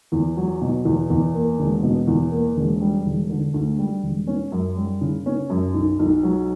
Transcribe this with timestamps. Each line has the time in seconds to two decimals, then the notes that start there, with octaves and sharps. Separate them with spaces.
0.12 E2
0.37 F#3
0.61 B2
0.85 E2
1.10 E2
1.34 A#3
1.59 E1
1.83 B2
2.07 E2
2.32 A#3
2.57 E1
2.81 G3
3.06 E1
3.30 D3
3.54 D2
3.78 G3
4.03 E1
4.27 C#4
4.52 F#2
4.77 G3
5.01 C#3
5.26 C#4
5.50 F#2
5.74 B1
5.99 B1
6.23 F#3